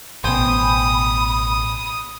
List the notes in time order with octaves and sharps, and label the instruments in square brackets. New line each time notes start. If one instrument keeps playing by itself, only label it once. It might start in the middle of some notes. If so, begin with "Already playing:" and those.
[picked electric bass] A1 B2 [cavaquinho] C5 G5 G#5 [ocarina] B5 [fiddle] D#6